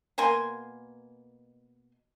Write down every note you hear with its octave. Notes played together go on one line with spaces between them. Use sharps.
B2 A#3 G#5 C6